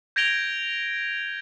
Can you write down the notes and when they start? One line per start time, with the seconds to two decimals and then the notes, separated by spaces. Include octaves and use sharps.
0.16 G6 G#6 A#6 D7 F7 G7